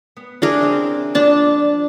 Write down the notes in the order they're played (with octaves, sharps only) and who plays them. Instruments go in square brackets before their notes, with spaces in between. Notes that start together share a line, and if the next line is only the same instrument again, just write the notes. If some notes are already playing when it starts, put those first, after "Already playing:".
[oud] B3
[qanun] D4 G#4 A#4 [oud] E4
[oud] C#3 C4 E5
[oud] F3 D5 [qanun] D4 A5